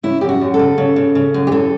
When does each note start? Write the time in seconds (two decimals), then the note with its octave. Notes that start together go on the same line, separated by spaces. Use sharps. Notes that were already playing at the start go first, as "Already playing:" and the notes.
0.03 C#3 E4
0.21 F#2 G4
0.29 F#4
0.41 F#2
0.54 A4
0.59 C#3
0.78 C#3
0.96 C#3
1.15 C#3
1.34 F#2
1.47 G4
1.52 E3 A4